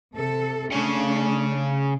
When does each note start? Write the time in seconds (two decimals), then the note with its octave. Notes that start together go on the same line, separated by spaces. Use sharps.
0.14 C3 A4
0.72 C#3 A3 C#4 D4